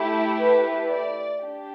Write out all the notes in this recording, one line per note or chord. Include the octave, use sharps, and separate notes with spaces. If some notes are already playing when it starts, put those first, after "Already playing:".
Already playing: A3 E4 G4
B4
D5
D4 G4